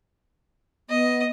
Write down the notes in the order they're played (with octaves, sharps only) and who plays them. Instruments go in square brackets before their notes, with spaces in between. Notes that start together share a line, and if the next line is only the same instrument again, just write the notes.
[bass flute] B3 [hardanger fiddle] D#5